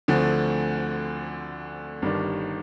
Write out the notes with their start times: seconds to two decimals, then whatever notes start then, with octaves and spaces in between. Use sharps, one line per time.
0.08 D2 D3 F3 A3 C4
2.02 G1 G2 D#3 G3 D4